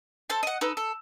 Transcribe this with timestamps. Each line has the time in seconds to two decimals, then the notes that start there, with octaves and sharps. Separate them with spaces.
0.30 A4 C5 A5
0.43 D#5 F#5
0.61 D#4 A4 B4
0.77 A4